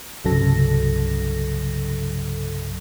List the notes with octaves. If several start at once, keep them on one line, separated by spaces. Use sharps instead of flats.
C2 G2 C#3 F#3 A4 A#6